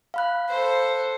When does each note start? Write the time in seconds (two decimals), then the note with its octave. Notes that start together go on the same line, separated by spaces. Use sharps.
0.14 F5 B5 F#6
0.49 A4 C5